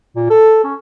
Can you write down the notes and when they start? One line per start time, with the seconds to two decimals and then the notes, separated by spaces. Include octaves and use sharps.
0.16 A#2
0.30 A4
0.64 C#4